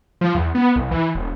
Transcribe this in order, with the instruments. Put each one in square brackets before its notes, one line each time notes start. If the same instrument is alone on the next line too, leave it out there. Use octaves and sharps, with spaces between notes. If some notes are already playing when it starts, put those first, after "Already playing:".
[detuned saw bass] F3
E2
B3
C2
E3
E1